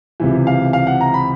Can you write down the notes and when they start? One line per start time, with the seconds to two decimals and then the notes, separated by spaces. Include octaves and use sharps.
0.20 C#2 C3 E3
0.47 F5
0.73 F5
0.87 F#5
1.01 A#5
1.14 B5